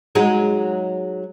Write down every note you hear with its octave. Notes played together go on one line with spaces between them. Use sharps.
F#3 G#3 D#4